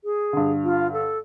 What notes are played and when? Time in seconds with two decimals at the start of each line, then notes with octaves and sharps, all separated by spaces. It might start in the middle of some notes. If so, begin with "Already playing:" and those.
0.04 G#4
0.33 G2 D3
0.64 F4
0.93 A4